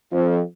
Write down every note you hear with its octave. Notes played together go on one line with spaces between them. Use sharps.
F2